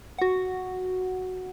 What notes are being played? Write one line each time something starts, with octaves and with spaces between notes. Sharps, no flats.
F#4 F#5